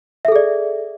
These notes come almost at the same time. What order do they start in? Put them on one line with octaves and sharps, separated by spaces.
E5 A4 G#4 D5